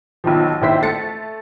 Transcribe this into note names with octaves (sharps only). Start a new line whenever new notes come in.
B1 D#3 F3
A#1 D#3 E4 C5 B6
A3 A6 C#7